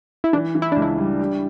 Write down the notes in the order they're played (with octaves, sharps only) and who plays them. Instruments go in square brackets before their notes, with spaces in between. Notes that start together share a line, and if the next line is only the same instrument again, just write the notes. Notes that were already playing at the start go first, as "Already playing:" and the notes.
[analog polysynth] E4
[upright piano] E3 [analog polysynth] D4
[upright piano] E3
[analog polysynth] E4
[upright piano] C#2 [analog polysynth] D4
[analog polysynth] E4
[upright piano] G3
G4